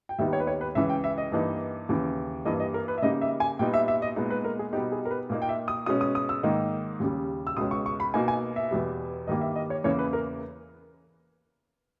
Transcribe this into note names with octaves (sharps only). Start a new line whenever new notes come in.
G5
D#2 D#3 G3 B3 D#4 E5
C#5
B4
C#5
B4
C#2 C#3 E3 E5
G5
E5
D#5
G2 E3 A#3 D#4
D#2 C#3 E3
G2 E3 A#3 D#5
D#5
A#4
B4
E5
C#3 G3 A#3 D#4 D#5
E5
G#5
A#2 G3 B3 D#4 G5
E5
E5
D#5
A#2 G#3 B3 D#4
B4
A#4
G#4
B2 G3 B3 D#4 G4
G#4
A#4
B4
A#2 A#3 D#4
G5
E5
D#6
B2 G#3 C#4 D#6
D#6
D#6
E6
G#2 D#3 A#3 D#4
D#2 C#3 G3
E6
C#2 B2 G#3 C#4 D#6
C#6
C#6
B5
B2 A#3 D#4 G#5
G#5
E5
E2 B2 G3
G2 D#3 G3 A#3 D#5
E5
D#5
C#5
E2 C#3 E3 A#3 C#5
B4
A#4